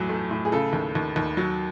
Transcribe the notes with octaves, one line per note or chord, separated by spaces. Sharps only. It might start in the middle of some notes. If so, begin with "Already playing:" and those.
Already playing: E2 A2 F#3
A3
A2
G#4
C#3 A4
D#2
D#2
D#2
F#3